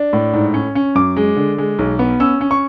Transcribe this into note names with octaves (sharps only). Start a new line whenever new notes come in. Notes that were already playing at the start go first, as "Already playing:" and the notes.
Already playing: D4
A2
G#2
C#4
C#4
F#2 D6
G#3
D3
G#3
B1
B3
C#4 E6
C#4
C#6